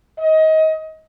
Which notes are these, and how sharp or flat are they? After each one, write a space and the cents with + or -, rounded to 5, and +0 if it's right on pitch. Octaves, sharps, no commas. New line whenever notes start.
D#5 +25